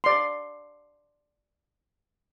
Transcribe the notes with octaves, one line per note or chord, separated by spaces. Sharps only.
D5 C6